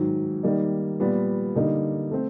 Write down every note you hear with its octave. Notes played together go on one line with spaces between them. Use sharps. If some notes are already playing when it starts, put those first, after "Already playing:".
Already playing: G#2 D#3 F#3
D#3 G3 A#3 D#4
A#2 G3 B3
D3 G3 A#3 D#4
A3 C4